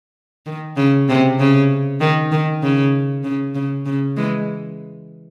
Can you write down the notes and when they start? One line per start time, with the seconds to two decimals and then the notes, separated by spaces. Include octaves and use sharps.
0.46 D#3
0.77 C#3
1.09 C3
1.39 C#3
2.00 D#3
2.32 D#3
2.62 C#3
3.24 C#3
3.55 C#3
3.86 C#3
4.17 E3 G#3